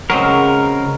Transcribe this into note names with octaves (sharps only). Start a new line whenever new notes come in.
C#3 F#3 G#3 C4 A#4